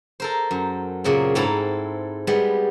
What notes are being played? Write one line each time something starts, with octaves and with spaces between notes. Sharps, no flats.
A4 A#4 C5
F#2
A#2 C#3 C4
G#2 C4 E4 A4 A#5 B5
G3 G#3 B3